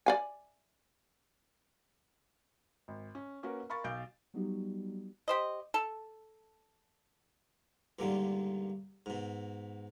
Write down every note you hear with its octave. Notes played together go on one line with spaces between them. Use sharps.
D5 F5 G#5
G#1
C#4
A#3 C#4 F#4 A#4 B4
A#4 F5 B5 C#6 A6
B1 F5 G6 D7
F#3 G3 B3 D#4 F#4 G4
G4 C5 D#5
A4
C#2 G2 A#2 D3 D#3
G#2 B2